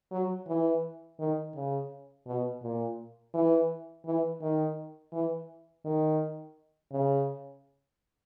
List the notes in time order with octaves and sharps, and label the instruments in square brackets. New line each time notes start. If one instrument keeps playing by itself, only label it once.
[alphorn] F#3
E3
D#3
C#3
B2
A#2
E3
E3
D#3
E3
D#3
C#3